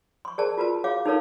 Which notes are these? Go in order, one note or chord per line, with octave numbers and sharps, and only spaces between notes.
C6 C#6
G#4 A#4 C5 D5 A5
F4 F#4 A#4 B4 A5
G#4 C#5 F5 D6
D#4 A4 A#4 C#5 F5